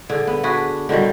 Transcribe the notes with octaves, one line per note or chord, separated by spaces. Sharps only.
D3 G#4
B3
D4 F#4 G#4 B4
D3 D#3 F#3 G3